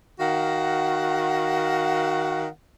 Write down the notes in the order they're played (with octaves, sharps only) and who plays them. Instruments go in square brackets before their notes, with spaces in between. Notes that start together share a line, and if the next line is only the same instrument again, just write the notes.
[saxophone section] D#3 F#4 F5 F#5